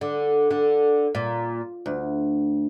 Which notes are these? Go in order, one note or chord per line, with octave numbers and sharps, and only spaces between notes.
D3
D3
A#2
D2